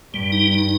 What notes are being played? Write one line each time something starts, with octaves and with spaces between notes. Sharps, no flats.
G2 G3
D#4
D#4